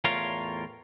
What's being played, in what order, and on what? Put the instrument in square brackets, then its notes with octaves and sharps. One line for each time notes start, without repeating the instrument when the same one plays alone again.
[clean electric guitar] E2 A2 F4 A#4 C#5 F5